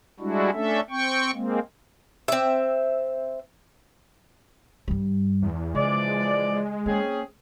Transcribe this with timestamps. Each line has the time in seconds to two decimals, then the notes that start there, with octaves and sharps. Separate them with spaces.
0.20 G3 G#3 D4 E4 F#4
0.53 A3 C#4 D4 A4 E5
0.90 C4 G5 C#6
1.34 G#3 A#3 C4
2.28 C4 E5
4.88 G2 G3
5.42 E2
5.75 C#3 E3 F3 G#3 D5
6.86 A#3 C4 C#4 G#4